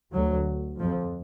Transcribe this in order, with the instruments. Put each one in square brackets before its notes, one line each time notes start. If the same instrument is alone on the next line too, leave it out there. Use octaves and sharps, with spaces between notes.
[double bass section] D2 F#3
F2 F3